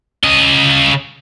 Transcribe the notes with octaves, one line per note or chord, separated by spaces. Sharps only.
C#3 D#5